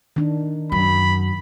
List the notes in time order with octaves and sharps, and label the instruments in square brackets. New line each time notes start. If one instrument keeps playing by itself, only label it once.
[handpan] D#3 D4
[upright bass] F#2 [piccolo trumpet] B5